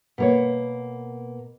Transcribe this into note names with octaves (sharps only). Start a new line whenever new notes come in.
B2 A#3 C#5